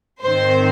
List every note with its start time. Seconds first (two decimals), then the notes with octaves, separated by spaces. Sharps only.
0.22 G#2 D#3 C4 C5